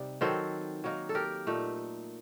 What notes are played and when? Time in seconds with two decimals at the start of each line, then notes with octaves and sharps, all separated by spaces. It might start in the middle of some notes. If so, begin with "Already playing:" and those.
Already playing: C3 G3 D#4 D5
0.21 D#3 F#3 C4 A4 C5
0.84 F#3 A#3 D#4
1.09 A4
1.15 G4 A#4
1.47 A#2 A3 D#4